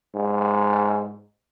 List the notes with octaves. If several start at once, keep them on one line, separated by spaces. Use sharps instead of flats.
G#2